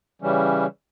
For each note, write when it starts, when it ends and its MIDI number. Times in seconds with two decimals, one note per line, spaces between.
0.22 0.66 49
0.22 0.66 52
0.22 0.66 55
0.22 0.66 61